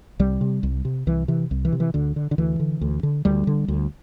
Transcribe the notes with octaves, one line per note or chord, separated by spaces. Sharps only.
C2 G3
C3
C2
C3
C2 E3
C3 E3
C2
E3
C3
E3
D2 D3
D3
D3
D2 E3
D3
D2
D3
D2 G3
D3
D2